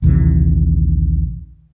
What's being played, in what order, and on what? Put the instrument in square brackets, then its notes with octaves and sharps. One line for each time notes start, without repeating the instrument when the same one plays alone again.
[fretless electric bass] A#1 D#2 C3 E3